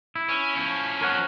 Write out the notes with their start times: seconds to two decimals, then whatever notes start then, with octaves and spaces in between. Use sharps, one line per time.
0.15 E4
0.29 C#4
0.56 F3 C#4
1.01 A#4 C#5 F#5